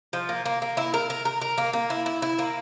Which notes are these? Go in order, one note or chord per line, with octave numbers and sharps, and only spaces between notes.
F3
A#3
A#3
A#3
E4
A#4
A#4
A#4
A#4
A#3
A#3
E4
E4
E4
A#3